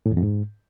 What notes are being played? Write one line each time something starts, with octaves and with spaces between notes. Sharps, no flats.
A2
E2
F2
G#2